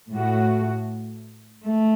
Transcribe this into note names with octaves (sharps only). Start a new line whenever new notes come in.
A2 A3 F#4
A3